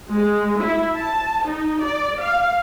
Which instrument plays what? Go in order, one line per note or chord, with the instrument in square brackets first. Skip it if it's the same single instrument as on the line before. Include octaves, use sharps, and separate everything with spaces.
[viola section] G#3
E4
A5
D#4
D5
F5